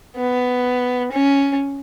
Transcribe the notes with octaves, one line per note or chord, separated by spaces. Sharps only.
B3
C#4